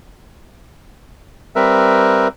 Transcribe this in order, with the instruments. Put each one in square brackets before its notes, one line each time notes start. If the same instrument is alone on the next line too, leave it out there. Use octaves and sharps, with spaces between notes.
[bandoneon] G3 C4 A#4 B4 E5